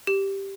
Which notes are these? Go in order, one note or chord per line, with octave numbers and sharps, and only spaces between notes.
G4